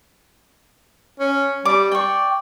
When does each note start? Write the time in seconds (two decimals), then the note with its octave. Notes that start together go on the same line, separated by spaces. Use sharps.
1.20 C#4
1.65 G3 D6
1.92 D5 G5 C#6